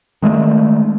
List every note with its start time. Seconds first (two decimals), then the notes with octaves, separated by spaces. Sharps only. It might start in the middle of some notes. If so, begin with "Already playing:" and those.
0.22 D#3 G#3 A3